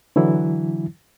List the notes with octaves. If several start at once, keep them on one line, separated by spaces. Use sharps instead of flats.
D3 E3 F#3 E4